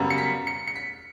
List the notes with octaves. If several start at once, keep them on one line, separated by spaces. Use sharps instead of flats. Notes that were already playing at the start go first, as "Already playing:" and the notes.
Already playing: F#2 C#3 G3 B3
C#7
B6
C#7
C#7
B6